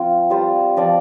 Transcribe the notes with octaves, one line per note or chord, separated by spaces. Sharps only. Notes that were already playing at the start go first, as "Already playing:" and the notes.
Already playing: F3 C4 F4
G3 F4 C5 F5
F3 C4 F4 D5